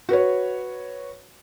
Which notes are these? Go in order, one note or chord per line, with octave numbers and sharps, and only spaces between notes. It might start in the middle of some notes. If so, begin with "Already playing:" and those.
F#4 B4 C#5